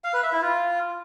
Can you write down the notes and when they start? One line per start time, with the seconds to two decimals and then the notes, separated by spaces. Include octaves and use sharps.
0.04 F5
0.14 B4
0.23 E5
0.33 E4
0.42 F4